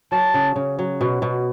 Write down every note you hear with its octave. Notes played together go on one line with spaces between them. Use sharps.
F#3 A5
C#3
C#3
F#3
B2
B2